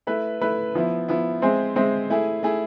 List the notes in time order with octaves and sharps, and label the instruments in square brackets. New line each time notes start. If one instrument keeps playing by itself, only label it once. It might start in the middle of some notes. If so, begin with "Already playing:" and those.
[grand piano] A3 E4 B4 E5
A3 E4 B4 E5
F3 B3 E4
F3 B3 E4
G#3 C4 G#4 C5 E5
G#3 C4 G#4 C5 E5
A3 E4 G#4
A3 E4 G#4